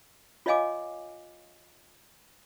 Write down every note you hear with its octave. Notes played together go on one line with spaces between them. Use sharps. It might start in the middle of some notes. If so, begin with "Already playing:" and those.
F4 C#5 D#5 F5 G#5 D6